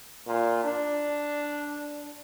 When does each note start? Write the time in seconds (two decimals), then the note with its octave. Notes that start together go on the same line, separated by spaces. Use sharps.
0.27 A#2
0.64 D4